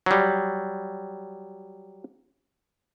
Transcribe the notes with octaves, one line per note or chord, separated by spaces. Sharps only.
F#3 G3